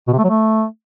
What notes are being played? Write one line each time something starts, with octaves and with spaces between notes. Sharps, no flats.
B2
C3
A3
F#3
A3